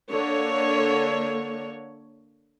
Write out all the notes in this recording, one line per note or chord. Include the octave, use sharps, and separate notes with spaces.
D3 A#3 C#5